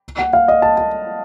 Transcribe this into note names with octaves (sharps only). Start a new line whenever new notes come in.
F#5
F5
D#5
A5
A5